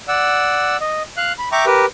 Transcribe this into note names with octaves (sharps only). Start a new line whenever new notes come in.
D5 F#5 E6
D#5
F5 F#6
B5
E5 G5 A#5 C#6 D6
G4 A#4 B4